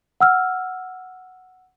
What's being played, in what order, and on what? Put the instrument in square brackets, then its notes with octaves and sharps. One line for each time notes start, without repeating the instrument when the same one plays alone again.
[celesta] F#5 E6 F6